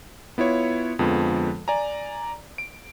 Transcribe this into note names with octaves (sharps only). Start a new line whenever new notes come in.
B3 E4 F4 C#5
F2 D3 F3 G#3 B3
D5 G#5 A#5
D7